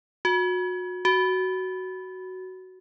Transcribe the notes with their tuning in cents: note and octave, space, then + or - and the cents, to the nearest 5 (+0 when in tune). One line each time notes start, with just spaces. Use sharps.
F#4 -30
F#4 +10